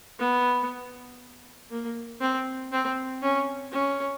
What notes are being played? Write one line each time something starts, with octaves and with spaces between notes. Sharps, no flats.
B3
A#3
C4
C4
C#4
C#4